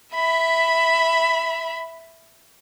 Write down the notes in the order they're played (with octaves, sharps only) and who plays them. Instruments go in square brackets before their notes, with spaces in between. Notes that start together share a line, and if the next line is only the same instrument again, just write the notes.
[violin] E5 B5